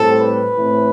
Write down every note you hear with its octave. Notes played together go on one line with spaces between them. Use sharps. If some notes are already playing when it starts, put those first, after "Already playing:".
Already playing: A2 G3 C4 A4
B4
A2 E3 A3 C4